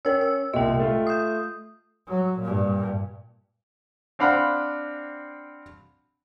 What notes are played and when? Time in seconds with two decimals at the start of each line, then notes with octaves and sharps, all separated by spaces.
0.05 C#4 A#4 E6
0.21 E6
0.54 C2 A#2 D#5 G5
0.80 A3 F4
1.07 D#6 G6
2.08 F#3
2.41 G2 A#2
4.19 C4 D4 F5 F#5 B5